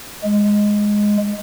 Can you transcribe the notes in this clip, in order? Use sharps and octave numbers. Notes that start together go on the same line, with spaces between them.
G#3